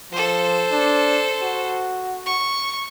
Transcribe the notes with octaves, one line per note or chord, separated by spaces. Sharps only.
F3 A4 C5
D4
F#4
C#6